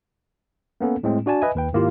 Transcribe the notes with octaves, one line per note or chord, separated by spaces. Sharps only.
A#3 B3 C#4 A4
A2 G#3 C4
D4 F#4 D5 G#5 A5
B4 D#5 E5 G#5
D#2 B4 G5
G#2 D#3 A#3 E4 F4 G4